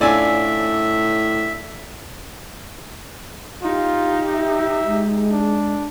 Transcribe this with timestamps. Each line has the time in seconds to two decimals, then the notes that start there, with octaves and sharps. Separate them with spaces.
0.01 A2 C#4 D4 F4 D5 E5 G#5 E6
3.63 D#4 F4 G4
4.34 E5
4.85 G#3
5.31 D4